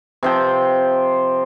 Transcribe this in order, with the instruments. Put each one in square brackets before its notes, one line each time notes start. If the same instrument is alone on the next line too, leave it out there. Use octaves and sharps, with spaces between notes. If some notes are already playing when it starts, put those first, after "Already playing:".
[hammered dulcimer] C3 F3 G5